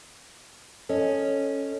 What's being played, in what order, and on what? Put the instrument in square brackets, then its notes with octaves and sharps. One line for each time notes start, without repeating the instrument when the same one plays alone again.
[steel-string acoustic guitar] C#4 [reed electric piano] A4 D#5